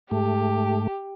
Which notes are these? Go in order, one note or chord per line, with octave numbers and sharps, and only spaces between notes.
G#2 A3 G4